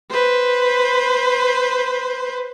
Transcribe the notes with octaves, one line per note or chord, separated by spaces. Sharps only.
B4 C5